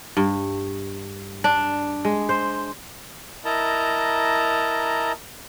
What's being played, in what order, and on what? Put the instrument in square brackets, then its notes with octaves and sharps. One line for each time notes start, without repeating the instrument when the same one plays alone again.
[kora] G2
D4
G#3
C5
[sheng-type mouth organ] E4 A#4 D#5 A5 A#5